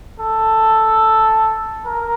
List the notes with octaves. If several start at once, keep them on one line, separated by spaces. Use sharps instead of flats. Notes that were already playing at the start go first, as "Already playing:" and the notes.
A4
A#4